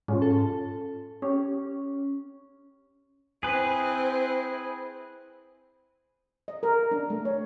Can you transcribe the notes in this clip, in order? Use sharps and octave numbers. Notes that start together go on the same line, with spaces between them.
G#2 C#4 F4
A4
C#4 G4
C4 E4 G#4 B4
D#5
A#4
D4
A3
C#5